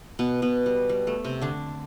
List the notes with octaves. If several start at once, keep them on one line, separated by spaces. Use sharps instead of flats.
B2 B3
B2 B3
G3
G3
A3
C3 C4
D3 D4